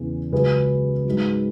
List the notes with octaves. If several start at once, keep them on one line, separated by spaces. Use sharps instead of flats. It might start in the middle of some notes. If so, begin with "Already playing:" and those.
Already playing: E2 C#3 E3
C#2 C#3 F#3 G#4 B4
G#2 F#3